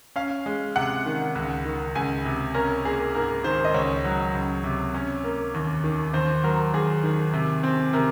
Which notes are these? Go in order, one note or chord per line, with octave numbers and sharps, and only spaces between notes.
C#4 F5
G#3
C3 F#5
D#3
C#2
D#3
C#2 G#5
C3
C#4 A#4
A#3 G#4
G#2 A#4
D#3 C5
D#5
C#2 C#5
F#3
C#2
C3
C#4
A#3
D#2
D#3
D#2 C5
F#3 A#4
D#2 G#4
D#3
C3
C4
C3 A#4